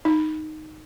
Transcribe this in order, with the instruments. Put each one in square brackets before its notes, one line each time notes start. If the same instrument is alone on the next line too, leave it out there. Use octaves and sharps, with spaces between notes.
[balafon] D#4